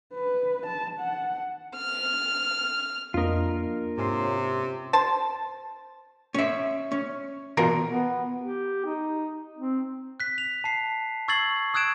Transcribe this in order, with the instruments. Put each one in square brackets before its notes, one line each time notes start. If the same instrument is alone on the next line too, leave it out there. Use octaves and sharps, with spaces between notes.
[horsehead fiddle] B4
A5
F#5
[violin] F6
[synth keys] F2 D#5 [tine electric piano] A#3 D4 [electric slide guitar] F4 A#4
[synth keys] G#2 C#4 C6 [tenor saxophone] C3
[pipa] C5 A5
[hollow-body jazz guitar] C#4 E5
C#4
[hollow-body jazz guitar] B2 E3 F4 [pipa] A#4
[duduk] B3
G4
D#4
C4
[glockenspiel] F#6 B6
F7
A5 C7
C#6 E6 G#6 A6 C7 F#7
D#6 E6 F#6 G#6 D7 E7